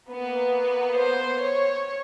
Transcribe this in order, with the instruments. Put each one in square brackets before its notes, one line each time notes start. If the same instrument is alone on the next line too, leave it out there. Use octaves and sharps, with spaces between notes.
[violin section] A#3 B3
[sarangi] C5
C#5